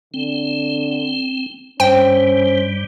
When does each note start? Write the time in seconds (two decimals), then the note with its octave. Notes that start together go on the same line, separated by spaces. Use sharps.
0.14 D3 C4
1.80 G2 G3 C#4 C5 G5